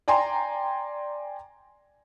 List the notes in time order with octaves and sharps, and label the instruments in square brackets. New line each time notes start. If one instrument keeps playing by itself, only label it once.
[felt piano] D5 G5 G#5 A#5 C6